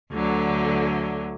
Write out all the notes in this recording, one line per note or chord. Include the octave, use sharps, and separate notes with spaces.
D2 D3 F#3